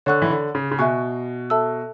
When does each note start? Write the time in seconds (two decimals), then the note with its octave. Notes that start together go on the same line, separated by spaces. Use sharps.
0.06 D3 C#5 F#5 C#6 F#6
0.22 E3
0.30 D3
0.55 C#3
0.71 C#3
0.78 B2 E5 G#5 C#6 F#6
1.50 A4 E5 A5 E6